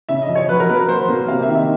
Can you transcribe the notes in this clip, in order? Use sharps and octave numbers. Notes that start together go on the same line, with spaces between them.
C#3 E5
D#5
F3
C#5
F#3 B4
A#4
A#3 B4
F#3 C5
A#3
C3 F5
E5
D#3
E5